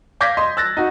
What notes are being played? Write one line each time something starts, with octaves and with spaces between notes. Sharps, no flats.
F5 D6 G6 G#6 A#6 B6
D#5 C6
E6 F#6 A6 A#6
D#4 F#4